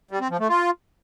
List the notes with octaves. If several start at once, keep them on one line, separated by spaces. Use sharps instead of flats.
G3
C4
F3
A3
F4